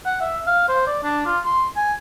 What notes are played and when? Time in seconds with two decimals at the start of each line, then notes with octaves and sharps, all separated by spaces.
0.05 F#5
0.21 E5
0.47 F5
0.68 C5
0.86 D5
1.03 D4
1.26 F4
1.45 C6
1.76 G#5